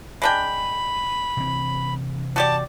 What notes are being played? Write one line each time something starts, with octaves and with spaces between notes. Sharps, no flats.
G#3 D4 G5 B5
C3 E3 C4
F#4 G4 D5 A5